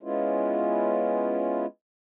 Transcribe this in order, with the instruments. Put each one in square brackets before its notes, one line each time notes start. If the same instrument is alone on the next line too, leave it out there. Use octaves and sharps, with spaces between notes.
[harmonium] G#3 B3 C#4 E4 F4